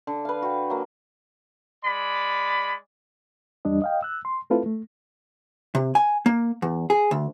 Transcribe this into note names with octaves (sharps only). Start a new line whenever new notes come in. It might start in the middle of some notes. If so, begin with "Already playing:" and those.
D3
B4 F5
F#4 G5
F#3 A#3
G#3 D5 B5
E2 G3 D4 D#5
D#5 F5 G5
E6 F#6
C6
A3 C4 E4 F4 A4 B4
A3
C3
G#5
A#3
E2
G#4
D2